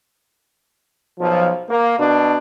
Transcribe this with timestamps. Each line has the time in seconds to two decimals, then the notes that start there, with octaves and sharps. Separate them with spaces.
1.17 B1 F3
1.68 A#3
1.97 B2 D4